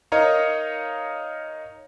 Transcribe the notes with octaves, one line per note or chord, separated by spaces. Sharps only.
D#4 A#4 C#5 D#5 F5 A#5